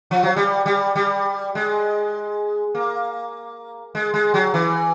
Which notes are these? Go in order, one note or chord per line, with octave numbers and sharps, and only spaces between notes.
F3
F#3
G3
G3
G3
G#3
A#3
G#3
G#3
F#3
E3